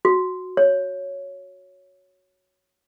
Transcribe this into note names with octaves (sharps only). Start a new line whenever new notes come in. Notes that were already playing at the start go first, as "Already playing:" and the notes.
F#4
C#5